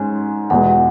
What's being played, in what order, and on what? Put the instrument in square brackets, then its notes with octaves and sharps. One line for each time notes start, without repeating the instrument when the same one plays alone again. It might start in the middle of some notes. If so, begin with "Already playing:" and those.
Already playing: [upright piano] G#2 G#3 C#4 [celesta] G#5
[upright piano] E2 B2 G#3 [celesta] F#5